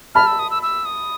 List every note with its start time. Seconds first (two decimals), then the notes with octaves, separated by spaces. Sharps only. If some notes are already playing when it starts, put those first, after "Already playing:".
0.15 A5 B5 F6
0.27 E6
0.39 D#6
0.50 E6
0.63 E6
0.85 D#6